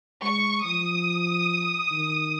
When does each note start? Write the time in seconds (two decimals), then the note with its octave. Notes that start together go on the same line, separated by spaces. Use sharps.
0.23 G#3 C#6
0.65 F3 D#6
1.92 D#3